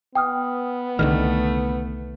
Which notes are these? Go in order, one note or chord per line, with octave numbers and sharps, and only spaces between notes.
B3 G5 D#6 F6
C2 D3 D#3 A3 F6